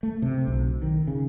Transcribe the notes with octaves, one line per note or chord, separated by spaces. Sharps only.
A3
C3
B1
D#3
C#3